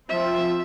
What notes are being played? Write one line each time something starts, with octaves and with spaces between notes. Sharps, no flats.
F3 C4 F4 E5